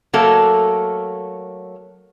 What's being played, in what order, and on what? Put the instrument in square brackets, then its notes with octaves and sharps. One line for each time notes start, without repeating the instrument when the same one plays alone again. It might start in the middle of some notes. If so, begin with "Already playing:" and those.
[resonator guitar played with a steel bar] F#3 A3 A#3 A4